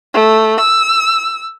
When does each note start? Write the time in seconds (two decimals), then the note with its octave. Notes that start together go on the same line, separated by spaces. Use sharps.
0.14 A3
0.60 E6